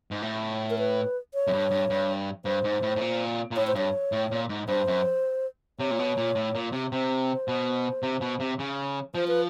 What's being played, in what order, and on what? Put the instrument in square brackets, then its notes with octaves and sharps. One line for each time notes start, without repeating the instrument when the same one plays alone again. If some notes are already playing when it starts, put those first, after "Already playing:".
[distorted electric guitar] G#2
A2
[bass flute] A#4
B4
C#5
[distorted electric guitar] F#2
G2
G2
G2
[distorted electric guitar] G2 [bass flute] C5
[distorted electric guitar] G#2
A2
A2
A#2
A#2
[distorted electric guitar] A2 [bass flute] C#5
[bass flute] C5
[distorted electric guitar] G2 [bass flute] C#5
[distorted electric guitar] A2
A#2
G#2
[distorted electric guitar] G2 [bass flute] C5
[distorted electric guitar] F#2
[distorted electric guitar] C3 [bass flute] C#5
[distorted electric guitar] A#2
B2
A#2
A2
A#2
C3
[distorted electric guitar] C3 [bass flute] C5
[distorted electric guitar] B2
C3
B2
C3
C#3
[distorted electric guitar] F3 [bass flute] C5
[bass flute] B4